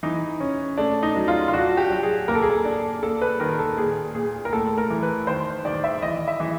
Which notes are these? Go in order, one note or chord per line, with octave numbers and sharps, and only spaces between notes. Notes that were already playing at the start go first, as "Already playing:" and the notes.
E3 D#4
C#4
A3 D4
D#4
F#3
F4
F4
D4 F#4
G4
F#3
G#4
A#3 A#4
A4
G#4
A4
D4
A#3 A4
B4
D#3 A#4
A4
A#2 G#4
A#2 G#4
A#4
A2 A4
A#4
E3
B4
D#3 C5
D#3 D5
E5
E3 D#5
E5
E3